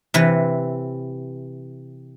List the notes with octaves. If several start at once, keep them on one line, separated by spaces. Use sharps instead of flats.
C3 E3 B4